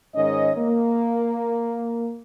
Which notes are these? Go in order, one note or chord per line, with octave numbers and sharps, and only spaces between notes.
G#2 D#3 C#4 D#5
A#3